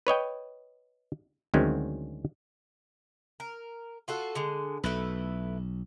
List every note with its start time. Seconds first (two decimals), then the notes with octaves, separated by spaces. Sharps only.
0.07 B4 C#5 D#5 G5
1.54 D2 D#3 F#3 G#3 C4 C#4
3.40 A#4
4.08 F4 F#4 A4
4.35 D3 G#3
4.84 B1 A3 E4 B4